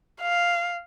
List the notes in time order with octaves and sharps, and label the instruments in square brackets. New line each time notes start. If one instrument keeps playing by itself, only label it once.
[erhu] F5